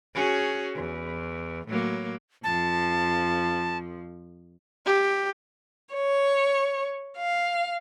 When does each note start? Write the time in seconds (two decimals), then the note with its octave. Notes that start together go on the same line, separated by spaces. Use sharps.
0.14 C#4 F#4 G#4
0.75 E2
1.67 A2 F#3 A#3
2.44 F2 F3 A5
4.86 G4
5.95 C#5
7.17 F5